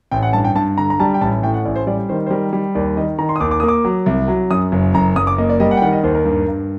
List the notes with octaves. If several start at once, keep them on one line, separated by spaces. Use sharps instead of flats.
A1 G5
F#5
G2 A5
G5
G2 A5
D3 A#5
A#5
G3 A5
G5
A1 A5
A2 G5
F#5
A1 D5
C5
G3 D5
D#3 C5
C5
G3 A#4
G3
D#2 D5
D#3 D#5
D#3 A#5
C6
D#6
D#2 D6
D6
A#3 D#6
D6
F#3
C2
F#3
F#2 D#6
F#1
F#1 A#5
F#1 D#6
D6
A#3 D#5
D5
G3 D#5
F#5
G5
D#3 F#5
D#5
D#2 C5
A#4
G2
G2